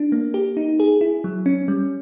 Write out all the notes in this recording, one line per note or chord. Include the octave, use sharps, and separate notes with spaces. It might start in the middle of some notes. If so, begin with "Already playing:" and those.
Already playing: D4
A#3
G4
D#4
G#4
E4
F#3
C#4
G3